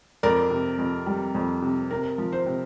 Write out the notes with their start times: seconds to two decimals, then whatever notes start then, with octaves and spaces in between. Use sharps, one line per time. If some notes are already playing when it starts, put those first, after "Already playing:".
0.23 F2 A#4 D5
0.51 C3
0.78 F2
1.06 G3
1.35 F2
1.62 C3
1.91 C3 A#4
2.18 F3
2.32 C5
2.46 C3